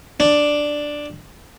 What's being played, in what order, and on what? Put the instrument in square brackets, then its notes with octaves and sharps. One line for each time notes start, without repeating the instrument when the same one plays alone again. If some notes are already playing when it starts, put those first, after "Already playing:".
[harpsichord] D4